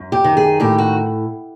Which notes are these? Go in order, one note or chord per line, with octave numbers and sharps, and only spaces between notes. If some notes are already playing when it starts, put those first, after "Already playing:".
Already playing: F#2
G4
D#3
G#4
A2 G4
F#4